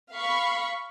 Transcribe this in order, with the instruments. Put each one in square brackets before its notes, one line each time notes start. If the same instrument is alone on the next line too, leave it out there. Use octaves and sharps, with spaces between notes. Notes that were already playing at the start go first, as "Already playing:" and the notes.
[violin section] F5 B5 C#6